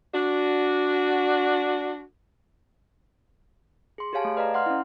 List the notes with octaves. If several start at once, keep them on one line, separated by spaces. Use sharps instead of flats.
D4 F#4
G#4 C6
G4 G#4 C#5 F5 G#5 A5
A3
B4 D5 D#5 F5 A#5
F#5 C6 F6
C#4 E4